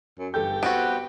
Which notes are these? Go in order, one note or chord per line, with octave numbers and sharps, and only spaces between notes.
F#2
G1 G4 A4 G6
B3 C4 F#4 D7